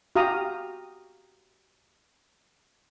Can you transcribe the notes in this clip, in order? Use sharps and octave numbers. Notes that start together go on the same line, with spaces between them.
F#4 G4 F5 A#5 D#6